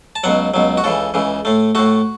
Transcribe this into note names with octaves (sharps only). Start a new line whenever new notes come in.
A5
C#2 B2 F#3 F#5
C#2 B2 F#3
F#4
C#2 C#3 E3 A4
C#2 C#3 E3
A2 A3
A2 A3 F#4